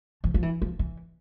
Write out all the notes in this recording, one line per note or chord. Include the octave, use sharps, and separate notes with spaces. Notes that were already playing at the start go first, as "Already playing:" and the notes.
F3
F3
E3
F3
E3